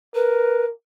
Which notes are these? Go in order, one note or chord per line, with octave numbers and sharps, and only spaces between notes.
A#4 B4